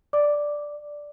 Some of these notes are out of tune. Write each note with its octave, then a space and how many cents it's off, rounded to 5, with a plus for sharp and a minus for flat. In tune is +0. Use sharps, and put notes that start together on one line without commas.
D5 +0 D6 +0